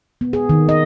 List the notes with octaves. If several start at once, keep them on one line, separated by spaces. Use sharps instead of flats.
B3
G#4
D#3
D#5